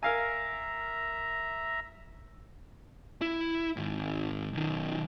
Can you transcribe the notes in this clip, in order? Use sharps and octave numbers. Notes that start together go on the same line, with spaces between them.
A#4 E5 F5 G#5 A#5
E4
G#2 D#3
B1 D#3